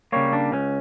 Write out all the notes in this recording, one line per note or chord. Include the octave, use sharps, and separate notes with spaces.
C#3 G3 A#3 C#5
D4
C#2 C#4